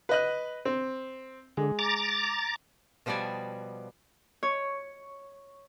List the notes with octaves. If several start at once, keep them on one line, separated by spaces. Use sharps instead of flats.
B4 D#5 F#6
C4
D3 G#3
A#5 D6 A6
B2 F3 G3 B3 D5 G#5
C#5